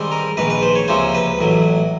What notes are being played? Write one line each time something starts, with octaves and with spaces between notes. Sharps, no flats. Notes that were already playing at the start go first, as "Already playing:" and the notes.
Already playing: G#2 D#3 G3 C4
A#4
A#1 G#2 D#3 B4
B4
C5
C#5
C#2 C3 F3 A#3 C#4 C5
B4
A1 A2 F#3